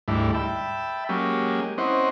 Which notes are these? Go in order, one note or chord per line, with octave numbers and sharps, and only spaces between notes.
D2 G#2 G3 A3 E4
E5 G5 A5 B5
F#3 G#3 A#3 C#4 G4
C4 C#4 E4 C5 D#5 F#5